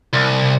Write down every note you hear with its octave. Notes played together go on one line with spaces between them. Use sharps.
C2